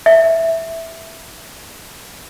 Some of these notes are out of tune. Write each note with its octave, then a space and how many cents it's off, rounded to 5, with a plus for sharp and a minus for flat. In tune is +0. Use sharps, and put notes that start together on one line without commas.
E5 -5